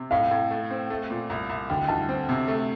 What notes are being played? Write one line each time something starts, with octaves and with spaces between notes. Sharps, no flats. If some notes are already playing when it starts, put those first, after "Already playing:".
Already playing: C3
A2 F5
A2
A3
C4
A3
A#2
C2
C2
D2 G5
D2 A5
C4
C3
A3